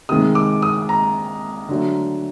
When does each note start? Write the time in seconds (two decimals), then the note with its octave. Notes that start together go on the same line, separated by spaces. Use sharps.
0.09 C3 D#3 G#3 D#6
0.35 D6
0.62 D#6
0.89 A#5
1.69 D3 F#3 A3